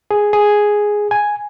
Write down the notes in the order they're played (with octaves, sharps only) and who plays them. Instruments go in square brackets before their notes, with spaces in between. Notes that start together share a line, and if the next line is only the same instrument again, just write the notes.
[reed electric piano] G#4
G#4
G#5